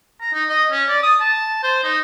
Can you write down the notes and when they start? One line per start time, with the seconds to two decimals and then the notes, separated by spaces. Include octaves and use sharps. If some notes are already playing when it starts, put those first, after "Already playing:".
0.21 A#5
0.34 D#4
0.49 D#5
0.71 C#4
0.89 D5
1.03 D#6
1.20 A5
1.63 C5
1.84 D#4